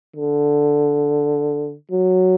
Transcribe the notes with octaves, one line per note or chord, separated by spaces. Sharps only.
D3
F#3